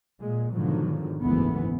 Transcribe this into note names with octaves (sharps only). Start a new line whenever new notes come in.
A#2 G#3
G#2 B2 D3 D#3 F3 F#3
F#1 D2 G#2 E3 B3